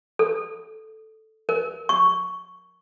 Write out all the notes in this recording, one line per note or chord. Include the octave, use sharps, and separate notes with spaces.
A4
A#4
C#6